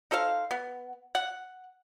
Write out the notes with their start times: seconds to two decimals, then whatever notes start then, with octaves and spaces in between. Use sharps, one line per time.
0.11 D#4 A4 C5 F5
0.51 B3
1.15 F#5